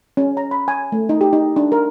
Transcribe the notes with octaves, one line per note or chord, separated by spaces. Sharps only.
C#4
A#5
B5
G#5
A3
D#4
G4
D#4
D4
A#4